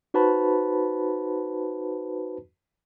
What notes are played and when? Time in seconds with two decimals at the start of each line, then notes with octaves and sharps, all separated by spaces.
0.14 D#4 F#4 B4 C5 A5 B5